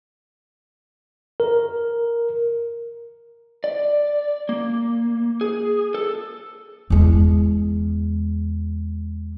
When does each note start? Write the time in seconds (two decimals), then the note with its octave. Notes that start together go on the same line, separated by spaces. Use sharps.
1.40 A#4
3.64 D5
4.49 A#3
5.41 G#4
5.94 A4
6.90 E2 G#3